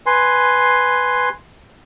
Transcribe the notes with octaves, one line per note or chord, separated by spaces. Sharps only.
B4 G#5 C6